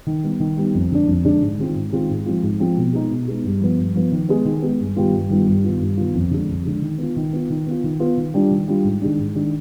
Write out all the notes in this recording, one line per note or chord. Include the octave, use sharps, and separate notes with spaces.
D#3
G3 B3 D#4
D#3
G3 B3 D#4
F2
D3 G#3 D4
F2
D3 G#3 D4
G#2
D#3 G#3 C4 F4
G#2
D#3 G#3 C4 F4
G#2
F3 G#3 C4 F4
G#2
F3 G#3 C4 F4
B2
G#3 B3 D#4
B2
G#3 B3 D#4
G2
F3 B3
G2
F3 B3
D#3
G#3 B3
D#3
G#3 B3
G2
D#3 G3 B3 F4
G2
D#3 G3 B3 F4
G2
D#3 B3 F4
G2
D#3 B3 F4
F2
D3 G#3
F2
D3 G#3
D#3
B3 F4
D#3
B3 F4
D#3
B3 F4
D#3
B3 F4
D#3
G3 D4 F4
D#3
G3 D4 F4
G#2
D#3 G#3 D4
G#2
D#3 G#3 D4